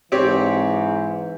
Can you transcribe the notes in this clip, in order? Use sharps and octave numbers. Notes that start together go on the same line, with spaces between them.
G#2 E3 C4 G4 C#5